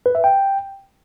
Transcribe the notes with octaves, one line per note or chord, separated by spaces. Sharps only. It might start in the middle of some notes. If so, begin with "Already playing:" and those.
B4
E5
G5